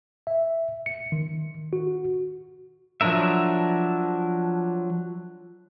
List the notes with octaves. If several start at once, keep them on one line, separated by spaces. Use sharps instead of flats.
E5
C#7
D#3
F#4
F3 F#3 D4 A#4 E5